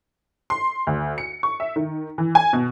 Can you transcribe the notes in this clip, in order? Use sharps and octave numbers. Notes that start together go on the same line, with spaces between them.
C6
D2
C#7
C#6
E5
D#3
E3
G#5
B2